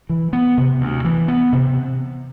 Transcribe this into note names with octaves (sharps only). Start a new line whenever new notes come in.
E3
B3
C3
D2
E3
B3
C3